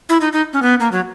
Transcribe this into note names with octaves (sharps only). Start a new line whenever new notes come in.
E4
D#4
D#4
C#4
B3
A#3
F#3